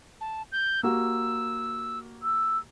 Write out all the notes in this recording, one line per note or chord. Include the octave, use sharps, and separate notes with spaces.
A5
G6
A#3 F#4 G4 E6
E6